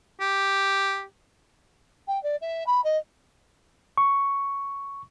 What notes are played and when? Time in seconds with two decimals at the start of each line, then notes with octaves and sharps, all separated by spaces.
0.21 G4
2.07 G5
2.23 D5
2.41 E5
2.66 B5
2.84 D#5
3.97 C#6